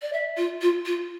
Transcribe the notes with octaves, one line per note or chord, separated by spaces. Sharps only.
D5
E5
F4
F4
F4